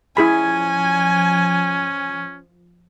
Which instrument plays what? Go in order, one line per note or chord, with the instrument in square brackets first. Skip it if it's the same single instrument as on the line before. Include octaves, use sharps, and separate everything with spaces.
[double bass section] F3 [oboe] C#4 [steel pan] E4 G#4 B5 [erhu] G#5